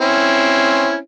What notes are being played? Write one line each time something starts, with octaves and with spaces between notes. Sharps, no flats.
C4 C#4 E4